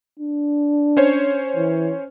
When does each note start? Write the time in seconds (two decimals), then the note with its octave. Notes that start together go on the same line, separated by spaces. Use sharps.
0.19 D4
0.97 C#4 C5 C#5
1.56 E3